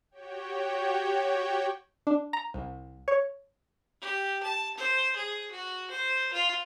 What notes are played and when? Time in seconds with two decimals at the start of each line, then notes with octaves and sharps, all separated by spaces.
0.11 F#4 G4 C#5 G5
2.07 D4
2.33 A#5
2.54 C2
3.08 C#5
4.01 G4
4.43 A5
4.78 C5
5.16 G#4
5.51 F#4
5.91 C5
6.33 F4